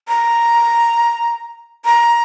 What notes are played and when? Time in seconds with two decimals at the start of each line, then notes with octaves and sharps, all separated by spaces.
0.08 A#5
1.85 A#5